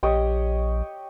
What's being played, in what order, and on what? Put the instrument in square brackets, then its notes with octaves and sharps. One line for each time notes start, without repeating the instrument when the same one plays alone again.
[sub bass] A#1 [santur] G4 C#5 D#5